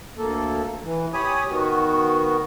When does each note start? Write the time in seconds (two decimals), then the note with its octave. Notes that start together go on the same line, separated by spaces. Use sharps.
0.18 D2 A#3 A4
0.84 E3
1.14 G4 C#5 G#5 B5 D#6
1.50 D#3 B3 F#4